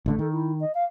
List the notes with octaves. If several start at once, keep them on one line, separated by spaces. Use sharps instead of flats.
A1 D3 A3
D#3 A4
E4
D#5
F5